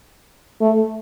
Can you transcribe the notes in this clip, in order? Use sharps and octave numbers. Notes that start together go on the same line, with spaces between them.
A3